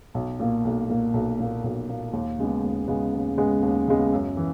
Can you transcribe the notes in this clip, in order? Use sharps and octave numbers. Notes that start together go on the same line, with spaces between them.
B1
A#2 A#3
B1
A#2 A#3
B1
A#2 A#3
B1
A#2 A#3
D#2
C#3 G#3 B3
D#2
C#3 G#3 B3
D#2
C#3 G#3 B3
D#2
C#3 G#3 B3
F#2
E3